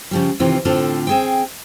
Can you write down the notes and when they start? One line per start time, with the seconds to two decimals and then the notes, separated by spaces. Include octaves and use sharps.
0.11 C#3 F3 G3
0.40 C3 D#3 E3 C4 F4
0.65 A2 D3 C4 F4 A4
1.07 C4 G#4 G5